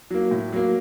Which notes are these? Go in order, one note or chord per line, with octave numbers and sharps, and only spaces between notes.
F#3 A#3
A2
F#3 A#3